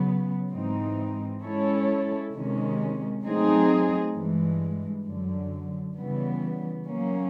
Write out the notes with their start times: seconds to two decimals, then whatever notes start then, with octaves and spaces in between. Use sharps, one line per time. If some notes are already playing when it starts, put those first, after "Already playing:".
Already playing: C#3 F#3 B3
0.52 G#2 E3 G#3 C4 D#4
1.42 G#3 C#4 E4 A4 C#5
2.33 C3 D#3 G#3 C#4
3.24 F#3 A3 C4 D#4 G#4
4.15 G2 E3 G#3
5.05 F#2 D3 F#3
5.96 C#3 E3 G3 B3
6.87 F#3 A#3 C#4